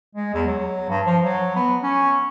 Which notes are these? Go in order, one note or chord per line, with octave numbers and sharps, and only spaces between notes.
G#3
E2
F#3
G2
F3
F#3
B3
C#4